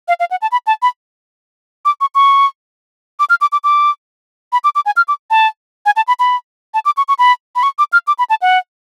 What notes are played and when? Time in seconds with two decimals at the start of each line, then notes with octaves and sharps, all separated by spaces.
0.08 F5
0.20 F5
0.31 F#5
0.42 A5
0.52 B5
0.67 A5
0.82 B5
1.85 D6
2.01 C#6
2.15 C#6
3.20 D6
3.30 F6
3.41 D6
3.52 D6
3.64 D6
4.53 B5
4.64 D6
4.75 D6
4.86 G#5
4.97 F6
5.08 D6
5.30 A5
5.86 G#5
5.96 A5
6.08 B5
6.19 B5
6.74 A5
6.85 D6
6.97 C#6
7.08 C#6
7.19 B5
7.56 B5
7.63 C#6
7.79 D6
7.93 F6
8.07 D6
8.19 B5
8.30 A5
8.42 F#5